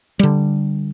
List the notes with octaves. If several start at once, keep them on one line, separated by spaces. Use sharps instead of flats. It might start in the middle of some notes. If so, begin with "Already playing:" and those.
D3 G3